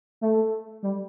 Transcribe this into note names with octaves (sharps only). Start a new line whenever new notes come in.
A3
G3